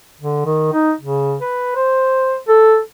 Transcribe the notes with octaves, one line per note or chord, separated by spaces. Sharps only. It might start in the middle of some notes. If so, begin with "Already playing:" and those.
D3
D#3
D#4
C#3
B4
C5
A4